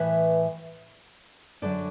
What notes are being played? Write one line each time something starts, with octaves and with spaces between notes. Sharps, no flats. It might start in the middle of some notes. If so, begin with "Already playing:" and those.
Already playing: A2 E3 B4 E5
F#2 D3 F#3 A4 D5